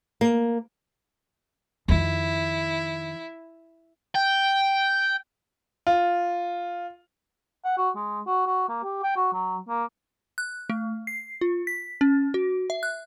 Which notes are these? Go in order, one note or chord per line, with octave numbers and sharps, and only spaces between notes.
A#3
F2 D#3 E4
G5
F4
F#5
F#4
G#3
F#4
F#4
A#3
G4
G5
F#4
F#3
A#3
F#6
A3
C7
F4
B6
C#4
F#4
E5
F#6